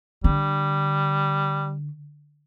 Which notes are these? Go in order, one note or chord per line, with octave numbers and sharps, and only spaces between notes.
D3 G3